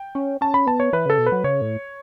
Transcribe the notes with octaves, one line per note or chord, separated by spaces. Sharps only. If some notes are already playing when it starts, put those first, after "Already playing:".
Already playing: G5
C#4
C#4 A5
B5
B3 A5
C#5
E3 B4
C#3 A4
B2
B4
F#3
C#3 C#5
A2